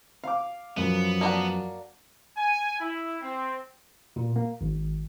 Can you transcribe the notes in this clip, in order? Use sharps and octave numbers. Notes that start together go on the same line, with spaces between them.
F5 D6
F#2 F3 F#3 B3
A#3 D4 F#4
G#5
E4
C4
A#2
A#3
G#1